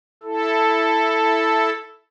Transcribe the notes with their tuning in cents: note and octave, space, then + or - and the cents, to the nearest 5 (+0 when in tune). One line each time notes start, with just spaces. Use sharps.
E4 +0 A4 +0